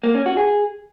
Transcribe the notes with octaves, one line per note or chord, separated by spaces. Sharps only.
A#3
C#4
F#4
G#4